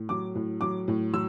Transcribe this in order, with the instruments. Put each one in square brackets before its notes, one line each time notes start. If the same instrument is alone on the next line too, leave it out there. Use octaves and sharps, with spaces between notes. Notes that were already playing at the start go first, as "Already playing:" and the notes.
Already playing: [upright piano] A2
F#3 D6
A2
F#3 D6
A2
F#3 E6